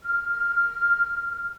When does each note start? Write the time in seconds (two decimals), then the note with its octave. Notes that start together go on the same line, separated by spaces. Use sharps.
0.03 F6